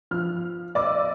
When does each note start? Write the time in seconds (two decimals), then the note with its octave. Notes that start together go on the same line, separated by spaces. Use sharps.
0.11 F3 F6
0.75 D5 D#5 D6 E6